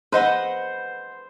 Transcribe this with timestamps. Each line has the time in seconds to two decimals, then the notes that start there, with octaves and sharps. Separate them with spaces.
0.12 B4 C5 D#5 F#5